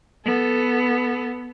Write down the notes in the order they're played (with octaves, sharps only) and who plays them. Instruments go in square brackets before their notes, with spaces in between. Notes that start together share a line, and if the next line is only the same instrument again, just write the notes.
[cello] B3 A4